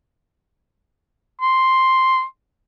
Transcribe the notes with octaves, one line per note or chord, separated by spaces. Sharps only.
C6